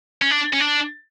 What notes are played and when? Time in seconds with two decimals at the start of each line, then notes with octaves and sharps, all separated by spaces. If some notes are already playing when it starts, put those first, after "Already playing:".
0.22 C#4
0.31 D4
0.54 C#4
0.61 D4